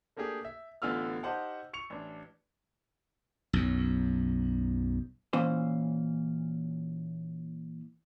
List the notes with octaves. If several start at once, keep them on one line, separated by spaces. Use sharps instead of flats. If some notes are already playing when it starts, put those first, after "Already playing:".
A3 A#3 D4 G4 G#4
E5
A1 D3 B3 F4 E6 F6
D#4 G4 C5 F#5 A5
C#6 C#7 F7
A1 D4
B1 F#2
A#2 E3 C#4 C5